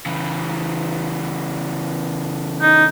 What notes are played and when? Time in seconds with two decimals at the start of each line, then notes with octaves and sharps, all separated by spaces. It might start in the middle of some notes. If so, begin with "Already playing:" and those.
0.06 C#3 E3
2.62 D#4